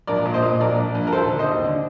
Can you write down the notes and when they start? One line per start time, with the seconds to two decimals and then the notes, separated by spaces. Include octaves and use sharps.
0.07 A#1 A#4 D5
0.26 A#2
0.33 C5 D#5
0.42 A#2
0.60 A#1 A#4 D5
0.78 A#1
0.95 A#1
1.07 A#4
1.12 D#2 A4 C5
1.30 D3
1.39 C5 D#5
1.47 D#2
1.64 D3